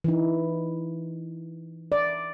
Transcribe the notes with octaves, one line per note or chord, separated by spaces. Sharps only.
E3 D#4
D5